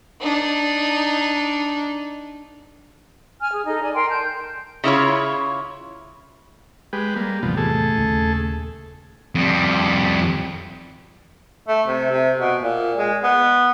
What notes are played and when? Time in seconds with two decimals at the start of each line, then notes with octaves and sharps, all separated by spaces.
0.21 D4 D#4
3.41 G#5 F6
3.53 G#4
3.67 D#4 A4
3.83 D5 G#5
3.94 A#4 G5 C6
4.09 A5 G6
4.84 C#3 E4 F4 C#5
6.93 G#3 G4 B4
7.16 G3 A#3
7.43 A1 E2 C3 F3 G3 B3
7.57 A3 G#4 A4
7.97 D#1 D#2 C#3
9.35 F2 G3
11.68 A3
11.87 C3
12.11 C3
12.39 B2
12.62 A#2
12.99 G#3
13.23 B3